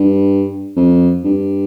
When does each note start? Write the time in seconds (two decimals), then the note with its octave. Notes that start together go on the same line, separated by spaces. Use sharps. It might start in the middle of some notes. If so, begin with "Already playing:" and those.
Already playing: G2
0.76 F2
1.24 G2